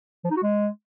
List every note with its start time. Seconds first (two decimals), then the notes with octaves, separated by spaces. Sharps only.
0.25 F3
0.31 D#4
0.37 F#4
0.43 G#3